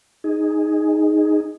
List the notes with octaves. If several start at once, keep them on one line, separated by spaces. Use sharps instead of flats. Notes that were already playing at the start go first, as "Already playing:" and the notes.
D#4 G#4